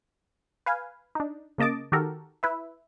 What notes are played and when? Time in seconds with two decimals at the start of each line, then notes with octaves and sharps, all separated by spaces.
0.66 B4 F5 G#5
1.15 D4 D#4
1.58 C#3 A#3 D#5 A5 D6
1.92 D#3 F#4 G4 A4 A#4
2.43 E4 B4 E5